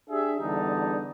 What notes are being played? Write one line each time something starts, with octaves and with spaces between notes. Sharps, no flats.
D4 G4 G#4 E5
E2 D3 G3 D#4 A5